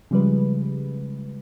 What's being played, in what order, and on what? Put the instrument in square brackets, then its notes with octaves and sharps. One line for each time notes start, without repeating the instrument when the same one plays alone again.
[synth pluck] C#3 F3 G3 G#3 B4